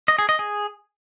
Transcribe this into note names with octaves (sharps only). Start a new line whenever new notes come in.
D#5
G#4
D#5
G#4